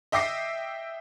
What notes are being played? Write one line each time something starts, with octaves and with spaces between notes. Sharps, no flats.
D#5 E5 G5 D6 A#6 C7